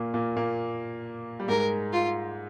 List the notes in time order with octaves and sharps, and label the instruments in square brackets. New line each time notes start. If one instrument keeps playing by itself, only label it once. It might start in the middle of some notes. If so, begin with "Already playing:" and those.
Already playing: [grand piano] A#2 A#3
A#2 A#3
A#2 A#3
G3
[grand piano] G#2 G#3 [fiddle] A#4
[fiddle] F4